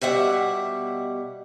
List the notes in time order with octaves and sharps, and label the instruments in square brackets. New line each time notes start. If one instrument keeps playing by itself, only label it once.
[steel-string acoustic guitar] B2 G3 E5 F#5